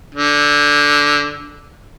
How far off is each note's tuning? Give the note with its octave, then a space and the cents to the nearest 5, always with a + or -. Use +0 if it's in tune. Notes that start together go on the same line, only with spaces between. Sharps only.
D3 -5